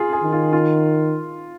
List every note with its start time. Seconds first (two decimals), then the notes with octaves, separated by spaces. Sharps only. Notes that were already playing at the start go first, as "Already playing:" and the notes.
Already playing: F4 G#4
0.13 G#4
0.23 D#3
0.32 F4
0.53 F4